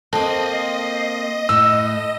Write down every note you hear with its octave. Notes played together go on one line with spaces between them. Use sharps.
A#3 C4 A4 D#5 A5
A2 E6